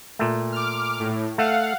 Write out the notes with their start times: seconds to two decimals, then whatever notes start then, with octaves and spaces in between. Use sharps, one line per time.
0.19 A#2 A3
0.52 D6 F6
0.99 A2
1.38 A3 F5 F#5